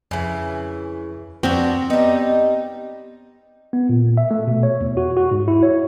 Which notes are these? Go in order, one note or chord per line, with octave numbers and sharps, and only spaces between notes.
F2 C#3 E3
F2 B3 C4 D4 F#4
G3 B3 D#4
B3
A#2
E5
A3
B2
C#5
E2
F#4
F#4
G#2
E4
C#5